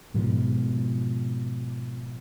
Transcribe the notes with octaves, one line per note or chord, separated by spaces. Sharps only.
G#2 B2 F3